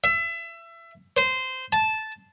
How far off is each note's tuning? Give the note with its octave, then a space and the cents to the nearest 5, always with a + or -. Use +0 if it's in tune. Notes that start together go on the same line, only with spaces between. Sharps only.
E5 +25
C5 -15
A5 -10